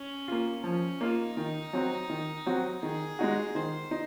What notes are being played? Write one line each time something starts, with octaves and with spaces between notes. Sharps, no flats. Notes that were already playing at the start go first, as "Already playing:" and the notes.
Already playing: C#4
A#3 F4
F3 C#4
A#3 D#4 F4
D#3
F#3 C4 F#4
D#3
F#3 C4 F#4
D#3 G#4
G#3 D#4 F#4
D#3 C5
D#4